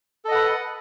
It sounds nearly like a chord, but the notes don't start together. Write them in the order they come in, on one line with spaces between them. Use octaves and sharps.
A4 D#5 F#5 B4